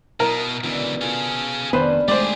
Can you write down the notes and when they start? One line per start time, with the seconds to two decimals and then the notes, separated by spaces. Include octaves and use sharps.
0.20 B2 E4 A#4 D#5
0.64 C#2 B2 D3 E3 C#4
1.01 F4 G#4 A4 F5 C#6
1.73 F1 D#3 G3 B3 C#4 D4 B4 C5
2.08 G#3 A3 G4 G#4 C5 D5